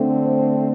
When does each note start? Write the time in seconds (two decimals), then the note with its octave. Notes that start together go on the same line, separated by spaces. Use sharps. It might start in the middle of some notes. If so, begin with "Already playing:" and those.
Already playing: D3 A3 C4
0.25 C5